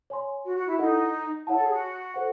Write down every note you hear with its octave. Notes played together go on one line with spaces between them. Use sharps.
C#5 G#5 C6
F#4
F#4
E4
D#4 E4 A4 D#5 F#5
E4 C#5 F#5 A5
A4
G#4
F#4
A4 C5 F#5